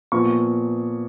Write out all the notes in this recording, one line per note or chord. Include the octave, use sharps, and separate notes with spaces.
A#2 F3 B3 C#6